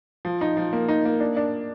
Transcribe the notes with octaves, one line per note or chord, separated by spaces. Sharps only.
F3
D#4
F3
A#3
D#4
A#3
D4
D4